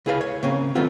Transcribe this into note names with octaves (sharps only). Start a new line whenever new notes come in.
C#2 E4 G#4 B4 E5 F5
C#5
C#3 A#3 C4 C#4
D#3 F#3 A3 B3 C4 F4